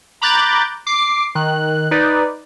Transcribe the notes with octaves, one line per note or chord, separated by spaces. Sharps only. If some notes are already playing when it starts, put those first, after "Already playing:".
A#5 B5 D6 F#6 G6 A6
D6 C7
D#3 F#6
D#4 B4 D5